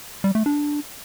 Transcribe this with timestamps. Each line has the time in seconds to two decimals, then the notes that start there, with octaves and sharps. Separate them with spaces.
0.24 G3
0.35 A3
0.46 D4